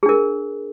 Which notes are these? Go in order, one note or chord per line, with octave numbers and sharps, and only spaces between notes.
D4 G#4 A#4